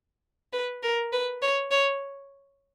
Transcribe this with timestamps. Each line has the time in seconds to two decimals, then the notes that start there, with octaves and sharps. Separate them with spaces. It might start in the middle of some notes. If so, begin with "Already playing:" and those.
0.53 B4
0.83 A#4
1.13 B4
1.42 C#5
1.71 C#5